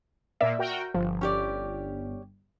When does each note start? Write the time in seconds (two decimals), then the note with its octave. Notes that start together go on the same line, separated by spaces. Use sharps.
0.41 A#2 A#3 D5 E5
0.59 F#4 A#4 G5
0.95 G1 F3
1.21 C#4 G4 D5